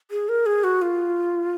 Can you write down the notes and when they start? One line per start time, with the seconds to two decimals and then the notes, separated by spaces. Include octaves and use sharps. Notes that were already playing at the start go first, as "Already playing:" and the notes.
0.11 G#4
0.29 A#4
0.46 G#4
0.64 F#4
0.82 F4